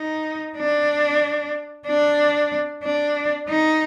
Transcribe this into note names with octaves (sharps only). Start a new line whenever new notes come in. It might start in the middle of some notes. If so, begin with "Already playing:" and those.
Already playing: D#4
D4
D4
D4
D#4